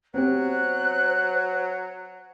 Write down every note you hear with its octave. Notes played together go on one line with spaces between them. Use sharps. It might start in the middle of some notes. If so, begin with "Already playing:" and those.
F#3 B3 C4 G4 C5 F#6